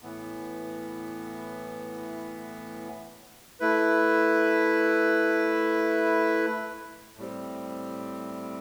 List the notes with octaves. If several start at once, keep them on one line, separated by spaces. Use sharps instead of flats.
A2 E3 B3
A3 E4 B4
A2 G3 C4